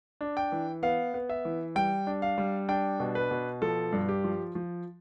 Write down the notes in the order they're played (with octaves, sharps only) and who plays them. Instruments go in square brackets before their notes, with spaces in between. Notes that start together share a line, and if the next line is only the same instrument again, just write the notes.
[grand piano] D4
G5
E3
B3 F5
B3
E5
E3
G3 G5
D4
F5
G3
D4 G5
B2
B4
B2
F3 A4
G2
G4
F3
F3